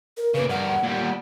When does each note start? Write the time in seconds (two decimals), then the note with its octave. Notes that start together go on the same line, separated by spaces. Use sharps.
0.17 A#4
0.34 C#3 A#3 B4
0.50 G2 A#4 F#5
0.83 A#2 G3